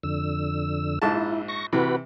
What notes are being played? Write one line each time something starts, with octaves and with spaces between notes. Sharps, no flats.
F2 D3 E6
A#1 G#2 E4 A5
C#6 A#6
C3 E3 F#4 B4 B5